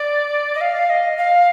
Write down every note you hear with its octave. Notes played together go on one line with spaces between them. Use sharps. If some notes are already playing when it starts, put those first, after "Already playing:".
Already playing: D5
D#5
F5
D#5
F5